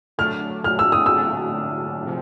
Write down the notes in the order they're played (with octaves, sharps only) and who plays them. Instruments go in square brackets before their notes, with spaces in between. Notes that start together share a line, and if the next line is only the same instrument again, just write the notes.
[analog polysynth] D3 F#3 A3 D4 [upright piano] F6
[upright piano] F6
E6
D#6
E6
[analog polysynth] D3 F#3 A3 D4
C3 F3